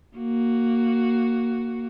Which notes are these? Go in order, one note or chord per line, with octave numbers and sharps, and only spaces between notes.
A#3 F#4